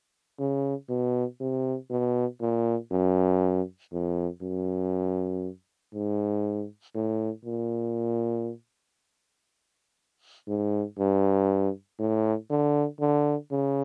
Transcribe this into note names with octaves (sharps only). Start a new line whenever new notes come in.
C#3
B2
C3
B2
A#2
F#2
F2
F#2
G#2
A2
A#2
G#2
G2
A2
D3
D3
C#3